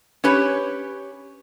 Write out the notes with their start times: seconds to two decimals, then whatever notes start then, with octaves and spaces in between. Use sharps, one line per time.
0.24 C#4 G4 B4 C#5